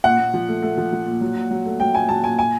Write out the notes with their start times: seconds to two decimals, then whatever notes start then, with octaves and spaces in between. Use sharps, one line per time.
0.04 A#2 F#5
0.19 A#2
0.34 F3
0.49 A3
0.62 A3
0.78 F3
0.93 F3
1.06 A#2
1.21 F#3
1.36 A#2
1.51 F#3
1.65 A3
1.80 F#3 G5
1.95 A#2 G#5
2.09 F#3 A5
2.23 A#2 G#5
2.39 G#5